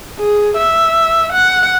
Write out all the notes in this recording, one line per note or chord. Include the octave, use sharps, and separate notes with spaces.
G#4
E5
F#5